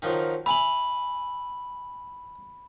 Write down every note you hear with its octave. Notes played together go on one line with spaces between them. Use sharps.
D#3 F3 F#3
E5 G#5 B5 D6 F#7